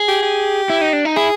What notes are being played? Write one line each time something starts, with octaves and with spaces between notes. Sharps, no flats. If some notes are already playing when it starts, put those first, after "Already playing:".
Already playing: G#4
G4
G4
E4
D#4
D4
D#4
E4 G#4